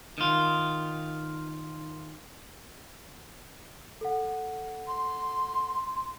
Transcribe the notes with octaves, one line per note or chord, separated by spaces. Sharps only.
D#3 F4
A4 F#5
C6